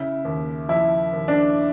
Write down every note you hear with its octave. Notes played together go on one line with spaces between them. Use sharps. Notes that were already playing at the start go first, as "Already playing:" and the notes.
Already playing: C#3 E4
D#2
F3 E4
D#2
D4